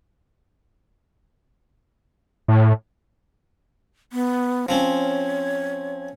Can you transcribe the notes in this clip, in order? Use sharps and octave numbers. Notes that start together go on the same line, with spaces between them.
A2
B3
F3 C4 C#4 C#5